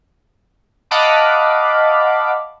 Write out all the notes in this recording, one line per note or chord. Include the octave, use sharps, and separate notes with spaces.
D#5 F5 F#5 A5 B5 D6